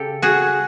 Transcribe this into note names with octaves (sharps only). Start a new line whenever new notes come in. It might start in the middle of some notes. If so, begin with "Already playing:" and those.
Already playing: C#3 G4 A4
F#4 G#4